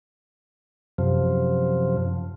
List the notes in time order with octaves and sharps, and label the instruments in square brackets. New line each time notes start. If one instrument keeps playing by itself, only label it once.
[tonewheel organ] F#2 C3 F3